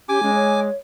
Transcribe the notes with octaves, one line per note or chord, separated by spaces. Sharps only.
C#4 G4 G#5 D6
G#3 C#4
C#5